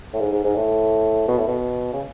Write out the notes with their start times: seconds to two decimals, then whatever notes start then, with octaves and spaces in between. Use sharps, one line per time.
0.14 A2
0.20 G#2
0.32 G#2
0.44 G#2
0.56 A2
1.28 B2
1.38 A2
1.48 B2
1.93 C#3